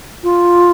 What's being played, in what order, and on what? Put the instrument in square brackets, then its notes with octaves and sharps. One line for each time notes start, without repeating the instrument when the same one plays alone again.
[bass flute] F4